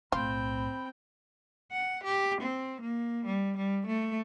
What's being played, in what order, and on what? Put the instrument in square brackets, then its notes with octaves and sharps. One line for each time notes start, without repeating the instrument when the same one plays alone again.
[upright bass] B1 A2 [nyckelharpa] C4 G5 [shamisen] F4 [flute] B5
[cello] F#5
G4
C4
A#3
G3
G3
A3